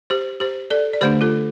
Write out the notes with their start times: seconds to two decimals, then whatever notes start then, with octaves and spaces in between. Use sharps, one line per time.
0.10 G4 C5
0.40 G4 C5
0.70 A4 D5
0.93 D5
1.01 D3 A3 D4 G4 C5
1.21 F4 A4